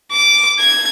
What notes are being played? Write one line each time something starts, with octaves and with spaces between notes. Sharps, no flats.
D6
G#6